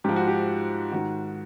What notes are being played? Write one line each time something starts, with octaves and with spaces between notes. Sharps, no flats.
G#2 F3 G4
F#4
G4
G#2 D#3 F#4